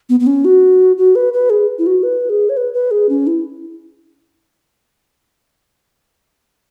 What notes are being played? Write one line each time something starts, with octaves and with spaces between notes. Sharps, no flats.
B3
B3
C#4
F#4
F#4
B4
B4
G#4
E4
F#4
B4
G#4
C#5
B4
B4
G#4
C#4
E4